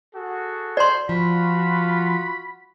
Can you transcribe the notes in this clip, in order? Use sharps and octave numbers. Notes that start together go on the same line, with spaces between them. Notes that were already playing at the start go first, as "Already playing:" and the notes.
F#4 G#4 A4
C5 D5 C6
F3 F4 F#4 B5